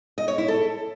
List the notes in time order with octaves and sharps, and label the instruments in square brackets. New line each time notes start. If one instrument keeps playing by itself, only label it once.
[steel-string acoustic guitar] D#5
C#5
E4
A4